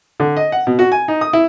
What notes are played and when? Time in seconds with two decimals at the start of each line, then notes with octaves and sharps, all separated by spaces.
0.20 D3
0.37 D#5
0.52 F#5
0.67 B2
0.79 F#4
0.92 G#5
1.08 D#4
1.21 D#6
1.33 E4